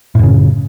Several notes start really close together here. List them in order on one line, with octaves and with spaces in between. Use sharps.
A2 F#2 C#3